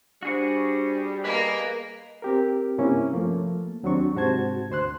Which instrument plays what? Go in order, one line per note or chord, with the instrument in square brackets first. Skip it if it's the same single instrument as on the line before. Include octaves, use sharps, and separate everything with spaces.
[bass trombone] G3 [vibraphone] D4 C5 [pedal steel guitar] F#4 G#4 C#6
[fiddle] A#3 A#4 [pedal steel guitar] G#4 B4 [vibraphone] D#5
[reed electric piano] C4 G4 A#4
G2 C3 A#3 C#4 E4
F3 A3 A#3
D#2 F#3 C4 D4 C#6
G#2 C3 F#4 C5 A5 G#6
D2 C5 C6 F#6